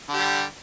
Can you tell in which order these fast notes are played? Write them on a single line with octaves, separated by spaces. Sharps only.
D3 G4 G3